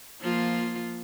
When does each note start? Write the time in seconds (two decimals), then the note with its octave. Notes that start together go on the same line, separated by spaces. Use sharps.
0.21 F3 A#3 F4